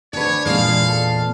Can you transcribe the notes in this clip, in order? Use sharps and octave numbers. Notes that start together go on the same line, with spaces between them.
D2 D4 B4 C#5
E2 A#2 G#3 F5
A4